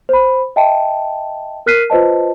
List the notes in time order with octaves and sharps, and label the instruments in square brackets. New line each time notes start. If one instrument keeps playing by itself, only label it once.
[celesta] C5 B5
D#5 E5 G5 A5
A#4 F6 F#6 B6 C7 D#7
F4 B4 C5 D#5 A5